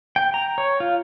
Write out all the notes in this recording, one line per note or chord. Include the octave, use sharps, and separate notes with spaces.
G5
A#5
C#5
F4